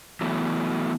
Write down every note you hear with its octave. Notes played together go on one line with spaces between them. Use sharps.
E3 F#3 A3 B3